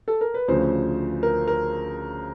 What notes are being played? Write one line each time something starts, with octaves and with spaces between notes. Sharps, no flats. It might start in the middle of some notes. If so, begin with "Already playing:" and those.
A4
A#4
B4
D2 C#3 F3 C5
A#4
A#4